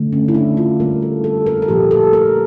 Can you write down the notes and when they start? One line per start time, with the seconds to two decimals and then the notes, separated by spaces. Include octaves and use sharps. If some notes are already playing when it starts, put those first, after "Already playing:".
Already playing: D3 A3
0.13 C#4
0.28 E4
0.34 D4
0.57 F4
0.80 D3 G3 A#3 A#4
1.02 A4
1.24 A4
1.46 A#4
1.62 A4
1.68 A#2 F3 A#3 G4
1.91 A4
2.13 A#4